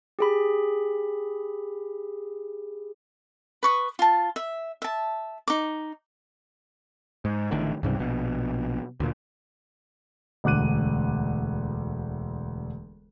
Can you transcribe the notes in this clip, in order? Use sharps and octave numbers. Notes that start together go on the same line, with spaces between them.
G4 G#4 B5
B4 C#6 D#6
F4 A5
E5
E5 A5
D#4 D6
G#2
A1 A2 D3 D#3
C#2 G#2 C3 G3
A#1 B2
D2 A#2
E1 D2 D6 F#6 D#7